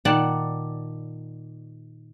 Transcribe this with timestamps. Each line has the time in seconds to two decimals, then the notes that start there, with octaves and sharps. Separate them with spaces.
0.05 A#2 D#3 D5 F#5 A5